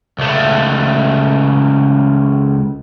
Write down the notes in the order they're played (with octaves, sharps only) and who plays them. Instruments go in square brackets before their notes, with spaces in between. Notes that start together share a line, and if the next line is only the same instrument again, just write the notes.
[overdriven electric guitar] C#2 A3